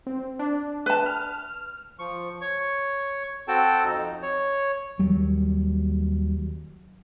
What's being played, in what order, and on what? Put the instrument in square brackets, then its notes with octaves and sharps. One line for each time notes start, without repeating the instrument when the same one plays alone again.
[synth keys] C4
D4
[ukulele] B4 A5
[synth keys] F6
[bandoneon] F3 C#6
C#5 C#6
C4 F#4 A4 G5 A5
F2 D#4
C#5
[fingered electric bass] D#2 F#3 G3